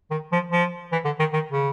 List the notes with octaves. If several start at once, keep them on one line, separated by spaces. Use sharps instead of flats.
D#3
F3
F3
E3
D3
D#3
D#3
C#3